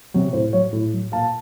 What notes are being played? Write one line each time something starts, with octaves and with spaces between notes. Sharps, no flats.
C3 F#3
A2 C5
F#3 C#5
A2
F#3
A#2 F5 A5